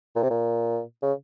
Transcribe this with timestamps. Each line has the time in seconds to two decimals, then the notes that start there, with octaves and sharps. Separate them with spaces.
0.16 A#2
0.23 C3
0.31 A#2
1.03 C#3